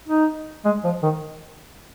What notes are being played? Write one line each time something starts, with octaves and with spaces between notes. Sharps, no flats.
D#4
G#3
F3
D#3